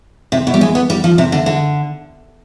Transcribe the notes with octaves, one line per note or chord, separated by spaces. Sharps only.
C3
B2
G3
G#3
B3
G3
F3
C3
D3
D3